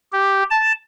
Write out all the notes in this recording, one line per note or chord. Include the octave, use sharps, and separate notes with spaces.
G4
A5